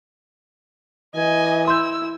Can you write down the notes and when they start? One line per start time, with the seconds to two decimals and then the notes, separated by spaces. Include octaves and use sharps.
1.15 E3 D#5 G#5
1.68 E4 C6 E6 G6